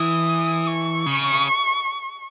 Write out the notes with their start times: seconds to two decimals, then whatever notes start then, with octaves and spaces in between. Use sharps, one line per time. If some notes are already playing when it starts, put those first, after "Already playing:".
Already playing: E3 D#6
0.67 C#6
1.06 C#3